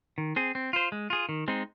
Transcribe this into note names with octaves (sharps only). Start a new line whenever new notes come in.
D#3
C4 G#4
C4
F4 C5
G#3
F4 G#4
D#3
G#3 C4 D#4